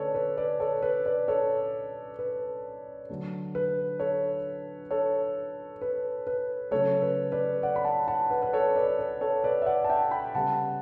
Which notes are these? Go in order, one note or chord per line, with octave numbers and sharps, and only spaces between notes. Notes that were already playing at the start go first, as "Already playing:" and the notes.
Already playing: D3 A3 C#4 A4 B4 C#5 D5
B4
B4 D5
A4 C#5
B4
B4 D5
A4 C#5
B4
D3 F#3 A3 D4
B4
A4 C#5
A4 C#5
B4
B4
C#3 F#3 A3 A4 C#5
B4
B4 D5
D5 F#5
B5
F#5 A5
F#5 A5
B4
B4
A4 C#5
B4 D5
B4
A4 C#5
B4 D5
E5
D5 F#5
A5
E5 G5
G5 B5
C#3 G3 B3 F#5 A5